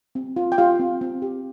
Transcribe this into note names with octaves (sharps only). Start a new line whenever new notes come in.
C4
F4
G5
F4 G4 F5
C4
C4
G4